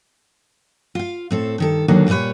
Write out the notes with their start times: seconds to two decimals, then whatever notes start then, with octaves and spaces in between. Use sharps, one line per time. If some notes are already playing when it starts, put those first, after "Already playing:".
0.95 F4 F5
1.31 A2 C4 A4
1.58 G2 D#3 A4
1.88 D#2 D3 D#3 F#3 A#3 D4
2.08 A#2 G3 D#4 B4 C#5